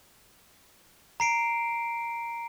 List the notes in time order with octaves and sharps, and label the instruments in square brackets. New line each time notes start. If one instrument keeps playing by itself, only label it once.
[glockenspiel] A#5 C7 D7